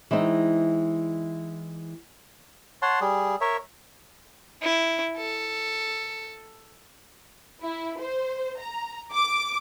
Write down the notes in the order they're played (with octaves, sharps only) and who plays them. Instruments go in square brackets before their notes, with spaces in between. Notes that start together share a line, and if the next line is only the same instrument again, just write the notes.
[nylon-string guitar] E3 G#3 C4 D#4
[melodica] C#5 F#5 A5 C6
G3 G#4
A#4 C#5 E5
[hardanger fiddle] E4
A4
[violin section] E4
C5
A#5
D6